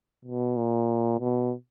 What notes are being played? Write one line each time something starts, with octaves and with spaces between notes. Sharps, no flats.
B2
A#2
B2